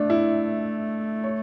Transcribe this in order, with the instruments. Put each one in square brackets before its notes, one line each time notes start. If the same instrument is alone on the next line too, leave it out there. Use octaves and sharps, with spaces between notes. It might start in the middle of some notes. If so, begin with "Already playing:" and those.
Already playing: [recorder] A3 [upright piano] D4
[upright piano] E4
C#5